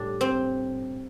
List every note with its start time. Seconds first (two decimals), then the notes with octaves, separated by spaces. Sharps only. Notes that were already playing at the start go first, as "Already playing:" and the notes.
Already playing: A2 G3 D4
0.21 C4